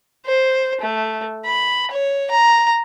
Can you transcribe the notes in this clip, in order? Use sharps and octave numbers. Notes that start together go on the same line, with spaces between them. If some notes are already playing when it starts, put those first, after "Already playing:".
C5
A3
B5
C#5
A#5